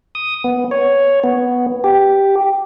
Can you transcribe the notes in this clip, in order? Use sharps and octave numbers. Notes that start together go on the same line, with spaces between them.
D#6
B3
C#5
B3
G4